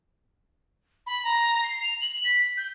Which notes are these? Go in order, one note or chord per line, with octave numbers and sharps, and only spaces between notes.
B5
A#5
C7
F7
F#7
B6
G6